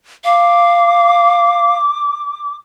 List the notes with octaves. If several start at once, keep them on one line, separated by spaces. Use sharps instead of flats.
F5 D6